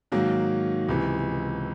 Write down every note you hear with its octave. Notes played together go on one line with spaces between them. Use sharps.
G#2 D#3 F#3 A#3
C#2 C3 E3